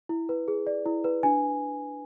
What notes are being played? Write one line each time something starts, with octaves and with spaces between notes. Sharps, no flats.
E4
B4
G#4
D5
E4
B4
D4 G#5